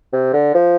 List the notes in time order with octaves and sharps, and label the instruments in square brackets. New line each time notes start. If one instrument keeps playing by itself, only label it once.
[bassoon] C3
D3
F3